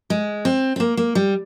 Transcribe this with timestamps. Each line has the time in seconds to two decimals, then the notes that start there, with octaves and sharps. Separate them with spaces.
0.10 G#3
0.45 C4
0.76 C4
0.80 A#3
0.97 A#3
1.15 G3